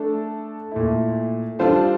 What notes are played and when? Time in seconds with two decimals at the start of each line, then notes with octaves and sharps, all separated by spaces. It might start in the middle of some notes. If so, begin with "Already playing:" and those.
Already playing: A3 D4 A4
0.71 A#2 A3 E4
1.59 G3 D4 F4 A4 C5